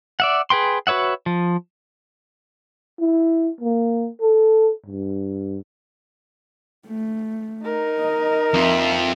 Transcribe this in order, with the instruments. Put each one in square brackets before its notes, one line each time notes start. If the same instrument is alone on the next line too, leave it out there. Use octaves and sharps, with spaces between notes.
[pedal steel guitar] D5 E5 F#5
G#4 B4 G5 C6
F#4 B4 C#5 E5 F#5
F3
[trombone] E4
A#3
A4
G2
[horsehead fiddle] A3
[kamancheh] D#4 A#4
[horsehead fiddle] D#5
[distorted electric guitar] F2 [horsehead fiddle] E5